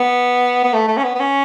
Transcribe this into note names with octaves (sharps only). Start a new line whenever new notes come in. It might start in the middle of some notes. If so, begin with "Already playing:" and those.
Already playing: B3
B3
A3
A3
C#4
B3
B3
C#4